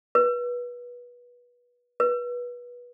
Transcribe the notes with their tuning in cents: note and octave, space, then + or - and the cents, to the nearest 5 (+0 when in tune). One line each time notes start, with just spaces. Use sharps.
B4 -25
B4 -25